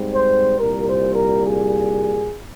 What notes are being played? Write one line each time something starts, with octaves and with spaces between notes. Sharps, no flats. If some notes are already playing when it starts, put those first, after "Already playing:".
Already playing: G#2 G3 C4
C5
C2 A#2 G3 A#4
C5
A#4
G#4